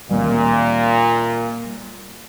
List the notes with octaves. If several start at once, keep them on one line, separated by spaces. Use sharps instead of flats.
A#2 G3 A#3